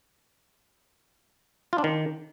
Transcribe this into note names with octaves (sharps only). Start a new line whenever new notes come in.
F4
D4
D#3